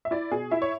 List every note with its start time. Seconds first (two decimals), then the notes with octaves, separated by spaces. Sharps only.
0.05 E5
0.11 E4 D5
0.31 B2 G#4
0.51 E4 E5
0.62 C#5